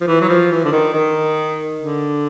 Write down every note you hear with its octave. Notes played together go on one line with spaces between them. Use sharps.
F3
E3
F#3
F3
E3
D3
D#3
D#3
D3